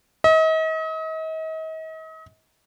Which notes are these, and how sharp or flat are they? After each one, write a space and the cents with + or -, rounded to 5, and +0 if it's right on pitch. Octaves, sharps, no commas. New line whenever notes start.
D#5 +40